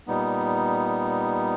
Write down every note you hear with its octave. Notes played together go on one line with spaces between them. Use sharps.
A#2 G3 B3 D#4